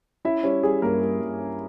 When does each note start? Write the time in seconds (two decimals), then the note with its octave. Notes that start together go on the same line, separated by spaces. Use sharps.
0.25 C#4 E4 E5
0.43 G3 C#4 C#5
0.63 G3 G#4
0.82 G2 A#3 A#4
1.02 G3
1.21 G2
1.39 C#4